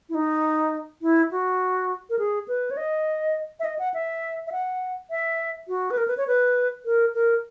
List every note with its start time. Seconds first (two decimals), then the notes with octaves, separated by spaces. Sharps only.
0.09 E4
0.15 D#4
1.02 E4
1.31 F#4
2.10 A#4
2.19 G#4
2.48 B4
2.71 C#5
2.77 D#5
3.60 E5
3.64 D#5
3.79 F#5
3.94 E5
4.47 E5
4.52 F#5
5.10 E5
5.68 F#4
5.91 B4
5.97 A#4
6.08 B4
6.17 C#5
6.27 B4
6.85 A#4
7.14 A#4